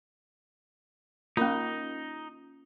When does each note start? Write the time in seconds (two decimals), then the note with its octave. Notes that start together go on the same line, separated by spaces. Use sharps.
1.37 A#3 C#4 D#4 F4